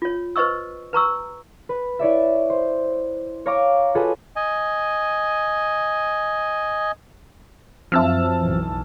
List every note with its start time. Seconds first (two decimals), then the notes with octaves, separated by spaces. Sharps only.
0.02 F4 C#5
0.36 B4 C5 D#5 C#6 E6
0.93 B4 A#5 C#6 E6
1.69 B4
1.99 E4 C#5 D5 E5
2.50 C5
3.46 C#5 F5 A#5 C#6 D6
3.95 F4 F#4 G#4 A4 B4 D#5
4.36 D#5 G#5
7.92 F#2 F3 F#3 C4 E5 A5 E6 F6
8.40 B1 E3